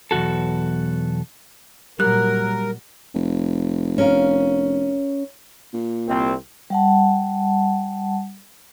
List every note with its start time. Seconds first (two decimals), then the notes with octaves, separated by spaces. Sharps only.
0.11 B1 E2 G#2 F#4 A4
2.00 A#2 F#3 G3 A#4 F#6
3.14 F1
3.98 C#4 A#4 F5
5.74 A#2
6.08 C2 C4
6.70 G3 F#5 A5